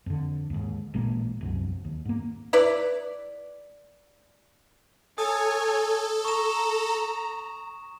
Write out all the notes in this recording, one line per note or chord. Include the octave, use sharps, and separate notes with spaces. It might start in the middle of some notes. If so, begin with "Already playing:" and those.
F2 D3
D#2 G#2
A1 A#2 G#3 A#3
E1 C2 F#2
D#2
G#2 A#3
E4 B4 D5
A4 C#5 G#5 D#6
A#5 C#6 E7